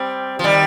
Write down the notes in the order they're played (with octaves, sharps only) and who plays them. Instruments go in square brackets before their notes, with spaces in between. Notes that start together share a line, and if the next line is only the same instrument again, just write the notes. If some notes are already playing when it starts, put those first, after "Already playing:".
Already playing: [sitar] G3 C4
F3
D#3 G3